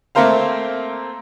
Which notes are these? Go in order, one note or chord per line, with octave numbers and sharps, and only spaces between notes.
A3 A#3 C4 A#4 C5 F5